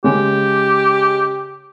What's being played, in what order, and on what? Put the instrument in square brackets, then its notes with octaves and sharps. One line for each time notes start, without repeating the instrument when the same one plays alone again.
[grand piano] C#3 G#3 [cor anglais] G4